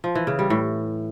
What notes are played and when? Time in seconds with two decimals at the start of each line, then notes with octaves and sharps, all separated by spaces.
0.04 F3
0.15 E3
0.27 C#3
0.39 G3
0.50 A2